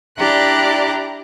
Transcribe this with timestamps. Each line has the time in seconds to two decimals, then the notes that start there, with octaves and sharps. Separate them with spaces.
0.17 D4 E4 G4 D5 A#5 F#6